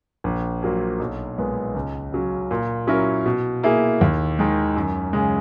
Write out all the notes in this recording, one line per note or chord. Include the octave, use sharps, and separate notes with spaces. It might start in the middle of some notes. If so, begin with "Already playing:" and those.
A#1
A#2 F#3 A#3
B1
A#2 G#3 B3
C#2
C#3 F#3 C#4
A#2
F#3 C#4 E4 A#4
B2
A#3 E4 G#4
D#2
D#3 G#3
F#2
C#3 G#3